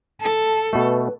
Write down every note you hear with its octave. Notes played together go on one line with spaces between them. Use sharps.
A4 A5
B2 A3 B4